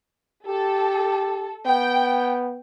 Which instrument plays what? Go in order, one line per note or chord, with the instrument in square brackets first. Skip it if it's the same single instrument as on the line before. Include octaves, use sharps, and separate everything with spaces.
[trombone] G4 [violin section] A4
[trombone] B3 [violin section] G5